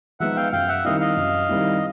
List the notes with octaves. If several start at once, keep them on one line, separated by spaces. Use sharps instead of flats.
F3 G#3 B3 D#4 E5 F#5
F5 G5
F#2 F5 G5
E5 F#5
D#3 G3 C4 E4 D#5 F5
D#5 F5
F#2
D#3 G3 C4 E4